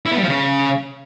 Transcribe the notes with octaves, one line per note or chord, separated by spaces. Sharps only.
E4
B3
G3
F3
C#3